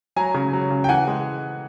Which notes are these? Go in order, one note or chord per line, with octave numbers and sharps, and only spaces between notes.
F#3 G#5 A#5
C#3
F#3
C#3
G5
E3 F#5 G#5
G#3